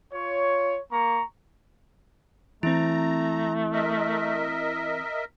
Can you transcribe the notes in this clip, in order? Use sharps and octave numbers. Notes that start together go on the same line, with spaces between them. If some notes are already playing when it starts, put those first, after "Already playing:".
F4 C#5
A#3 A#5 C#6
E3 A3 C4 E4 A#5
A#4 D#5 E5